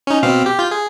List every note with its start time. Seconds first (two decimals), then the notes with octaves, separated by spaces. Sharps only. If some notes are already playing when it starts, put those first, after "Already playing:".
0.07 C#4 D#4
0.23 B2 C4 F5
0.46 G4
0.59 F4 G6
0.71 G#4